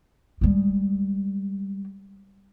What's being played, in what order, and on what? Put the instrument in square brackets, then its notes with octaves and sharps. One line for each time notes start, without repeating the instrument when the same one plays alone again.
[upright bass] G3 G#3